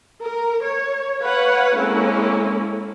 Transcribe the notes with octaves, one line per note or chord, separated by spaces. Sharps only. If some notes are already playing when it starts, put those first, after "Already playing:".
A#4
C#5
B4 C#5 F5 F#5
G#3 A#3 C4 C#4 E4 A4